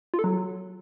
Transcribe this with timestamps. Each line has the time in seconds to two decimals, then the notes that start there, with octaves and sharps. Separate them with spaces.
0.14 F4
0.19 A4
0.24 F#3